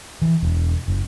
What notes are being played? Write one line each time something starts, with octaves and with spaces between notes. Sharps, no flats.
E3
E1
F#1